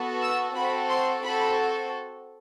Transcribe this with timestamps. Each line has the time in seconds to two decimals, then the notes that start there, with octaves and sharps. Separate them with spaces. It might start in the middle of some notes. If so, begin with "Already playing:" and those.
Already playing: B3 F#4 A4
0.21 E6
0.55 C4 F#4 A4 B5
0.89 C6
1.23 C4 F#4 A4 B5